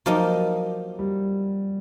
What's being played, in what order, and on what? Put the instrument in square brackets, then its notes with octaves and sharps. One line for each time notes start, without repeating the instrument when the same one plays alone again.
[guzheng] F3 A#3 D#4 G4 [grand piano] F#3
[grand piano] G3